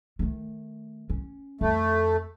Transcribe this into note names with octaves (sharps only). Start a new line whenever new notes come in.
D#3 A3
C#4
F2 A3